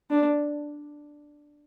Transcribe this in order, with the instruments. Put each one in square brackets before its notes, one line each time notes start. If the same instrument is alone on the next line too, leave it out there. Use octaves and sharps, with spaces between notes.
[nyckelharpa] D4